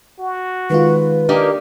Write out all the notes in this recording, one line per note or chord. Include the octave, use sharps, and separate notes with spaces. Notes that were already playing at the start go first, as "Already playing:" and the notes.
F#4
D#3 G#3 F4 B4
D#3 A#3 D4 G4 D5